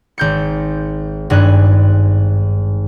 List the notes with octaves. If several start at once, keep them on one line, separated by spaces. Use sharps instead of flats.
G#1 G6 C#7
G#1 G2 G#5 F#6